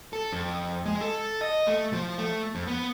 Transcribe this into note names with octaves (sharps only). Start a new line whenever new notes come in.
A4
F2
G#3
A4
D#5
A3
F3
A3
F2
B3